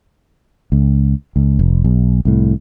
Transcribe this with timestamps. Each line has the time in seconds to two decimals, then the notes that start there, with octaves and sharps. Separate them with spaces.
0.72 C#2
1.36 C#2
1.59 F1
1.84 B1
2.25 C2 A2